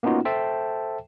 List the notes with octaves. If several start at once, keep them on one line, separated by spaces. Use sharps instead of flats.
A#3 B3 C#4 D#4 F4 F#4
A4 C5 E5 G5 A5